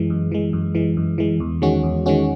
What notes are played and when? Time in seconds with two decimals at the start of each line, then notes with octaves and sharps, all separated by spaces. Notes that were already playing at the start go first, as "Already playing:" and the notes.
Already playing: F#2 E3 G#3
0.10 F#2
0.32 E3 G#3
0.53 F#2
0.75 E3 G#3
0.97 F#2
1.18 E3 G#3
1.40 E2
1.62 D#3 G#3 C#4 F#4
1.83 E2
2.06 D#3 G#3 C#4 F#4